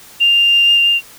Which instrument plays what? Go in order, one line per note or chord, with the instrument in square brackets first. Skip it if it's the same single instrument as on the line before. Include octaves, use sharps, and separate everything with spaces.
[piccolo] F7